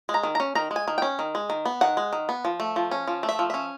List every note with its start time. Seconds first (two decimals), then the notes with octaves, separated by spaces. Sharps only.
0.09 G#3
0.14 A#5
0.23 D#3
0.35 C#4 A#5
0.55 D#3 A#5
0.71 G#3
0.76 G#5
0.88 D#3
0.98 C#4 G5
1.19 D#3
1.35 G#3
1.50 D#3
1.65 B3
1.81 D#3 F#5
1.97 G#3
2.13 D#3
2.29 B3
2.45 F3
2.60 A3
2.76 F3
2.91 C#4
3.08 F3
3.23 A3
3.29 E5
3.39 F3
3.50 C#4 E5